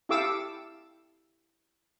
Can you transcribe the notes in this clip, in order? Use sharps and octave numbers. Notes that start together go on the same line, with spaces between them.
E4 G4 A4 F5 D6 E6